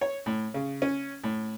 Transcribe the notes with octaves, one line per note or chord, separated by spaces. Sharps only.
C#5
A2
C#3
C#4
A2